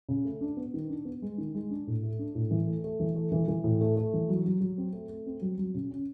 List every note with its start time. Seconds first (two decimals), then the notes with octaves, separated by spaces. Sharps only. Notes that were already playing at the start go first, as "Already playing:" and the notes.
0.09 C#3
0.25 A3
0.41 D4
0.57 B3
0.74 D#3
0.90 D4
1.05 B3
1.22 G#3
1.38 D#3
1.55 G#3
1.70 D4
1.87 A2
2.03 A3
2.19 D4
2.35 A2
2.51 E3
2.67 A3
2.84 A3
3.00 E3
3.16 A3
3.32 E3
3.48 E3
3.64 A2
3.81 A3
3.96 A3
4.13 E3
4.29 F#3
4.46 F#3
4.61 F#3
4.78 C4
4.93 A3
5.09 A3
5.26 C4
5.42 F#3
5.58 F#3
5.74 C#3
5.91 C#4